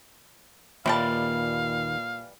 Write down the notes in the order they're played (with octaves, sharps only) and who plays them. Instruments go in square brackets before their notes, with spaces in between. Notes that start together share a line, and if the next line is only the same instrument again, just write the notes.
[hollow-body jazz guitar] D#2 G5 [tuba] A#2 [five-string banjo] E3 G3 A5 [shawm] F5